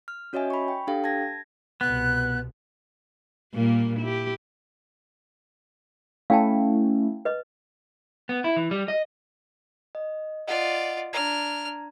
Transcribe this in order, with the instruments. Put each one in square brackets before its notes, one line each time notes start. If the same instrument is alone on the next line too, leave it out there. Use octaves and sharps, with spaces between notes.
[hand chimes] F6
C#4 F#4 C#5 D#5 E5 G#5
B5 C#6
G5
D4 G4 A4 F5 G5
A5 G#6 A#6
[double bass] C2 B2 [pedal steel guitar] B3 [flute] F#6
[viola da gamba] A#2 G3 A#3
E4 G4
[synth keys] A3 C#4 E4 [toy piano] F5 G5 A5
[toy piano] B4 D#5
[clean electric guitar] B3
E4
E3
G3
D#5
[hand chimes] D#5
[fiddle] F4 D5 [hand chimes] D#5 F#5
[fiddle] D4 F6 [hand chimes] A#5 G#6